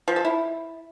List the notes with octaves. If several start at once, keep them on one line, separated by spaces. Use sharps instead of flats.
F3
A4
E4